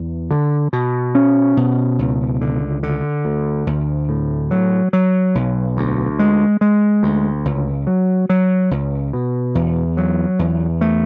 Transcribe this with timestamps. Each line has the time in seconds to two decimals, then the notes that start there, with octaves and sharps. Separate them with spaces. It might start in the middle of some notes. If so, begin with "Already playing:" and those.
Already playing: E2
0.31 D3
0.73 B2
1.15 C#4
1.57 B2
1.99 C#2
2.41 D3
2.83 D3
3.25 D2
3.67 D2
4.09 A2
4.51 F#3
4.93 F#3
5.35 B1
5.77 D2
6.19 G#3
6.61 G#3
7.03 D2
7.45 C#2
7.87 F#3
8.29 F#3
8.71 C#2
9.13 B2
9.55 E2
9.97 F#3
10.39 E2
10.81 A3